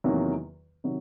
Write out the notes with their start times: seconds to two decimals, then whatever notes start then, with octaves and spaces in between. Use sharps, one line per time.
0.04 E2 C3 D#3 F#3 A#3
0.84 C3 D#3 F#3